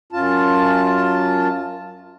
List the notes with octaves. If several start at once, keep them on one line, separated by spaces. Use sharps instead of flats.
F#2 F4 A5